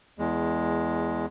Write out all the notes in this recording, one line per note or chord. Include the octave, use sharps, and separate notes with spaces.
E2 G#3